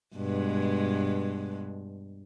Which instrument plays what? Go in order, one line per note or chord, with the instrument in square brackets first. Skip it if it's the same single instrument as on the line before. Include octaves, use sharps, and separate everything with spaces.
[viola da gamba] G2 B2 G#3